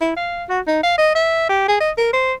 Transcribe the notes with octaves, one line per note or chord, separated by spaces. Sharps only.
E4
F5
F#4
D#4
F5
D#5
E5
G4
G#4
D#5
A#4
C5